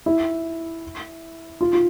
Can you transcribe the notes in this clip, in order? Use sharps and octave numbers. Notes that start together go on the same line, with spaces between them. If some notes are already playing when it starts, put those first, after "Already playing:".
E4
F4
F4